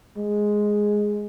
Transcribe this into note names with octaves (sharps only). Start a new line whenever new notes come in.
G#3